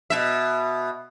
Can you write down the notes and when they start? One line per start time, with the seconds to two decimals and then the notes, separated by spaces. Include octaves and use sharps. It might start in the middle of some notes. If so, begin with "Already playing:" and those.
0.10 B2 E5